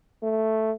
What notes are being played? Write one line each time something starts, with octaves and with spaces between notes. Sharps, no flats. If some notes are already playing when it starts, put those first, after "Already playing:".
A3